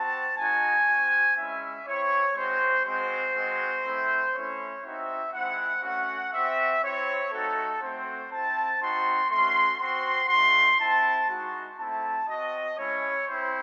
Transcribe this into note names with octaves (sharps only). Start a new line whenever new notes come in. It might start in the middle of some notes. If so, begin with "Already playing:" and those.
Already playing: C4 F#4 A5
G#3 D#4 F#4 G#5
C4 F#4
G#3 C#4 E4 E5
C4 E4 C#5
G#3 C4 F#4 C5
G#3 C4 F#4 C5
G#3 C4 F#4
A3 C4 E4
A3 C#4 E4 C#5
C4 D#4 F#4 E5
G#3 C4 E4 F#5
A3 C#4 F#4 F#5
C4 F#4 E5
C4 E4 C#5
A3 D#4 F#4 A4
A3 C4 F#4 C5
C4 E4 A5
C4 D#4 F#4 C6
A3 C#4 F#4 C6
C4 F#4 C6
A3 D#4 F#4 C6
C4 E4 A5
G#3 D#4 F#4
A3 C4 E4 A5
C4 F#4 D#5
G#3 C#4 E4 C#5
C4 E4 C5